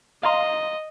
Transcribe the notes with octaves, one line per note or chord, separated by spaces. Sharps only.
D#5 F5 A#5 C6